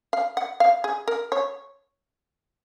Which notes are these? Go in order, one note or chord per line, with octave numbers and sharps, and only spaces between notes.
F5
F#5
F5
G#4
A#4
C#5